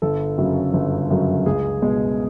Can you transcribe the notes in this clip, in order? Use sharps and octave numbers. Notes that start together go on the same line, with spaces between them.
G1 A4
F#2 C#3 F#3
G1
F#2 C#3 F#3
C#2 G#4
B2 G#3